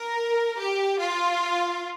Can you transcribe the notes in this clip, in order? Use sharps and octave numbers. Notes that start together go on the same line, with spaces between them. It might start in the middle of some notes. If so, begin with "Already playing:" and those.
Already playing: A#4
G4
F4